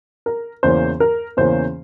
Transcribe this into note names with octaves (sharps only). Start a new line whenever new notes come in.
A#4
E2 C#3 E3 A#3 C#4 C5
A#4
E2 C#3 E3 A#3 C#4 C5